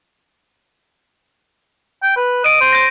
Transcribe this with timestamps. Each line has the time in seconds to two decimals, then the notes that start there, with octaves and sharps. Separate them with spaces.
2.03 G5
2.16 B4
2.44 D#5 D7 D#7
2.61 C5
2.72 G6 A#6